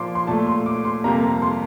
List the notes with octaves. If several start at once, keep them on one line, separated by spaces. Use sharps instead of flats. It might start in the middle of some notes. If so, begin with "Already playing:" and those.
Already playing: A#2 F3 A#3 C6 D6
C6
A#2 A3 A5
C6
D6
C6
F2 C3 G3 A#3 A#5
C6